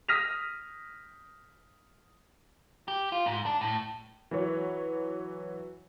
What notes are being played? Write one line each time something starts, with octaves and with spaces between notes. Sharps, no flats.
D#6 F6 A#6 B6 D#7 F7
G4
F4
G#2
D4
A2
E3 F#3 B4 C#5